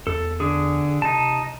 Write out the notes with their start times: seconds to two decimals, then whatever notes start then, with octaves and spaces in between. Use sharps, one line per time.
0.07 E2 A4
0.40 D3 G#4
1.02 C3 D#4 A5